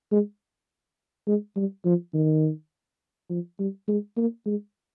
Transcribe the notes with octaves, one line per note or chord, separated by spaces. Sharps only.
G#3
G#3
G3
F3
D#3
F3
G3
G#3
A#3
G#3